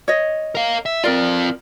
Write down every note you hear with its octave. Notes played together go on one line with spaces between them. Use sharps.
C#5 D#5
A#4 F5
E5
C4 F4 A#4 D5